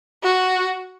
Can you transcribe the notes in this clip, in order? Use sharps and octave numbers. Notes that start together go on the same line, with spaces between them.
F#4